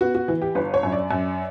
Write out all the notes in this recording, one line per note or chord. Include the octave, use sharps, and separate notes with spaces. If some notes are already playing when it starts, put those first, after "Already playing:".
B3 F#4
F#4
E3
G4
G1 B4
C#5
F#2
D5
F#2